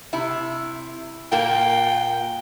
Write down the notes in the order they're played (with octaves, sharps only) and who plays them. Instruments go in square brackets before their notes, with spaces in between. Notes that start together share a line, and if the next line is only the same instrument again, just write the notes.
[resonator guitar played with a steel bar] C3 E4
[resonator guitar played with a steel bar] A#2 A#3 [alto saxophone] G5